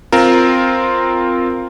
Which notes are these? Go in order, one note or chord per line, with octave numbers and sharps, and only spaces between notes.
C4 F4 A#4